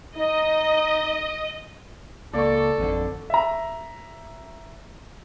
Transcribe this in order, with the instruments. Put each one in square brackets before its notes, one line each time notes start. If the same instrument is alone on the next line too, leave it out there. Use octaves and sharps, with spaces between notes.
[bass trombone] D#4 [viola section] D#5
[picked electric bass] C#2 A#3 [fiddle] A4 [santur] D5 C#6
[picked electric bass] G#1 F2 D3
[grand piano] E5 A#5